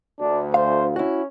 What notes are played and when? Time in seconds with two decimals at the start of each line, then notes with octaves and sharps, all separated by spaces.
0.20 D2 D4
0.54 C5 F5
0.96 C#4 E4 F#4